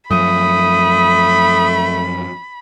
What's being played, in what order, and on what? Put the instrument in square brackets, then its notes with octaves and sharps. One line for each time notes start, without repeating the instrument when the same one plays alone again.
[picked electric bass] F#2 F3 [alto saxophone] A3 [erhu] B5 [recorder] D#6